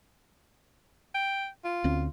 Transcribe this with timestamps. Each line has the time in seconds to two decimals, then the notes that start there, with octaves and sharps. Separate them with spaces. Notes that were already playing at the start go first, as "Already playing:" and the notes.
1.14 G5
1.65 F4
1.84 D2 C4 C#4